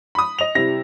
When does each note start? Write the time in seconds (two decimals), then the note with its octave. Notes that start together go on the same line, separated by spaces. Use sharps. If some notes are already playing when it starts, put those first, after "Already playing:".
0.15 B5 D#6
0.39 D#5 F7
0.55 C3 G3 E4 A#6